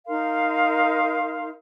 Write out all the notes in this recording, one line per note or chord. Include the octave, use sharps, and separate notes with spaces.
D#4 A#4 F5 C6